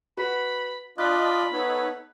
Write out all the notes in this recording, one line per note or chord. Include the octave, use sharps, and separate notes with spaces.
F#4 B4 B5
D4 F4 D5 D#5 B5 F#6
B3 D#4 A4 C#5